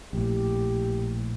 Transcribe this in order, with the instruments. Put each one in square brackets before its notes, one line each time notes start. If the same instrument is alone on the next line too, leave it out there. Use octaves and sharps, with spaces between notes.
[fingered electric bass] A#1 A2 [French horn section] G4